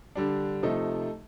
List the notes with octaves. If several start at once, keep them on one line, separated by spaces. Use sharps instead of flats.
D3 G3 D4
C3 F3 A3 D#4 A4